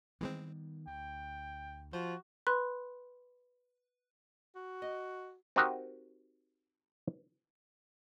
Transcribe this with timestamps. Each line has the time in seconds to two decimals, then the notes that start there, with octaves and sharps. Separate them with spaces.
0.21 D#3 E3 G3 G#3 B3 C4
0.87 D2 G5
1.93 F3 F#4 C5
2.47 B4 B5 C6 F#6
4.55 F#4
4.82 D#5
5.56 C4 D#4 F#4 G4 A#4 D#5